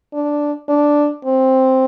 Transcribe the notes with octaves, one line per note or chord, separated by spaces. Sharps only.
D4
D4
C4